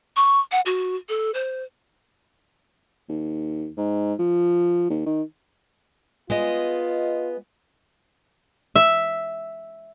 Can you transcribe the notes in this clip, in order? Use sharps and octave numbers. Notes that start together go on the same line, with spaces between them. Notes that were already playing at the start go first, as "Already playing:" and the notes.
C#6
F#5
F#4
A4
C5
D#2
G#2
F3
D#2
D#3
G#3 B3 F4 D#5
E5